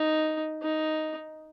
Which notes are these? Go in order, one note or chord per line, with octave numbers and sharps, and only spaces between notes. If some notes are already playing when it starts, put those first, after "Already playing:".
Already playing: D#4
D#4